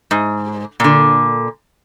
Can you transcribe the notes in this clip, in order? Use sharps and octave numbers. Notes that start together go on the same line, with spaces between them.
G#2
A#2 D3